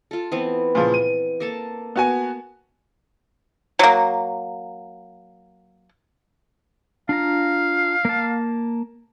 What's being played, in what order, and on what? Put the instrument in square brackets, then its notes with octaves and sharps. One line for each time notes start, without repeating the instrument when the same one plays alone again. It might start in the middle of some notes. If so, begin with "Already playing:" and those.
[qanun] F4 A4
E3 B3 C4
[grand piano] A#2 C#3 F3
D#7
[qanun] A#3 A4 A5
[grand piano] B3 F#4 G#5
[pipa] F#3 A#3
[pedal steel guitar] D4 F4 A#5 [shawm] F5
[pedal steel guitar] A#3 A5